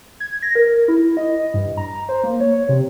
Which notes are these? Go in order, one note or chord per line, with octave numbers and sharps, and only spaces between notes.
G#6
A#6
A#4
E4
D#5
G2
A#5
C5
A#3
C#5
C3